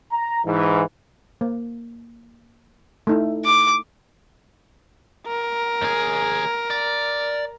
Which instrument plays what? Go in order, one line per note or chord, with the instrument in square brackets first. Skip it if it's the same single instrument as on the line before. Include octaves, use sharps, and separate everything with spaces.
[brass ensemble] A#5
G#2 E3
[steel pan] A#3
A3 D#4 E4
[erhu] D6
[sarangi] A#4
[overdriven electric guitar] D#2 G#4
D5